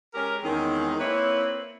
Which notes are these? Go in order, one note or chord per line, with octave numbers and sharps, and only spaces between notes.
G#3 C#4 G4 A#4
E2 D#3 G#3 C4 C#4 D#4
A#3 C4 E4 B4 C#5